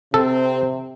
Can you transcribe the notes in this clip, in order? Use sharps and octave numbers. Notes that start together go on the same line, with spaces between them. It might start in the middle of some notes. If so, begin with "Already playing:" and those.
C3 C4 A4